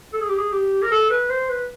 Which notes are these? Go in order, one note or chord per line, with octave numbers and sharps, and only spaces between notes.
A4
G#4
G4
G#4
G4
A#4
A4
B4
C5
B4